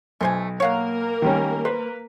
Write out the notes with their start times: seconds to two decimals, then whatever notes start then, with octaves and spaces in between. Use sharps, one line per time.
0.21 B1 A3 C5 G#5
0.60 A#3 A#4 C#5 F5 F#5
1.22 D#3 G3 C#4
1.65 B4 C5